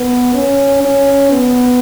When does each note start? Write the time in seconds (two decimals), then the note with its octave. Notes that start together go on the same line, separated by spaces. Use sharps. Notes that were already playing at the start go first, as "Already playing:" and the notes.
Already playing: B3
0.34 C#4
0.83 C#4
1.31 B3